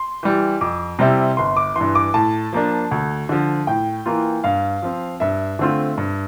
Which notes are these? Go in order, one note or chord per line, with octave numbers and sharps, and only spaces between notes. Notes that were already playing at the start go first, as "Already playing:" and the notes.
Already playing: C6
E3 G3
F2 D6
C3 G3 C4 E4
G1 C6
D6
G2 E3 C6
D6
A2 A5
F3 A#3 D4
D2
D3 F3
A2 G5
E3 A#3 F4
G2 F5
F3 C4
G2 E5
D3 A3 C4 F4
G2